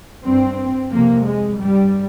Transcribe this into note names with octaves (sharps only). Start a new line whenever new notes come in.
G2 C4
F2 C3 A#3
G#3
G2 G3